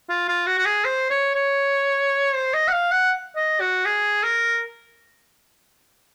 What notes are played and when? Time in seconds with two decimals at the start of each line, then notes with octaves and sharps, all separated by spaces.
0.09 F4
0.28 F4
0.47 F#4
0.58 F#4
0.65 G#4
0.85 C5
1.10 C#5
1.35 C#5
2.35 C5
2.54 D#5
2.68 F#5
2.73 F5
2.92 F#5
3.36 D#5
3.60 F#4
3.85 G#4
4.23 A#4